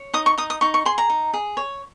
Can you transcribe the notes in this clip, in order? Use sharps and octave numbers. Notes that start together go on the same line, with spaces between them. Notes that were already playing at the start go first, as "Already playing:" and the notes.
Already playing: C#5
D#4 D#6
C#6
D#4 D#6
D#6
D#4 C#6
C#6
G#4 C6
A#5
D#4
G#4
C#5